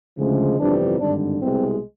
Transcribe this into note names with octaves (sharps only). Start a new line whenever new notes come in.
D2 C#3 F3 G#3
G1 F2 C3 E3 G3 D4
G#1 G2 D3 D4
C2 B2 G#3 C4